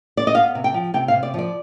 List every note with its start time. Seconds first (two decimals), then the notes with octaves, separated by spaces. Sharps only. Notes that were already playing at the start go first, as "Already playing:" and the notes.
0.17 D5
0.27 D#5
0.35 B3 F5
0.55 C3
0.64 G5
0.74 F3
0.94 C3 G5
1.08 F5
1.13 C3
1.23 D5
1.34 F3 D5